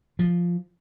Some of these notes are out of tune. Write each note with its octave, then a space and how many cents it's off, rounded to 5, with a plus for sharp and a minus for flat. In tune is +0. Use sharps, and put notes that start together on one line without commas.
F3 +0